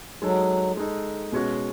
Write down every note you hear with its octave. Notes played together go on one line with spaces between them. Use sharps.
F#3 G#3 D#4 A4
G#3 D#4 A4
B2 G#3 C#4 F#4